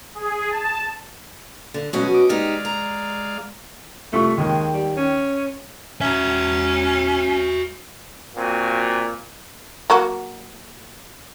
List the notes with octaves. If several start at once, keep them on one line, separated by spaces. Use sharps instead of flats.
G#4
A5
D3
B2 F#3 G#3 C#4 F#4 D#5
D#5 D6
G#3 D#4 G4 D5 F5
A#5
C2 A3 F4 C#6
D#2 D#3 G#3
G3
C#4
C#4 F#4 E5
A#2 C4 F#4 G#5
F#3 A#3 F#4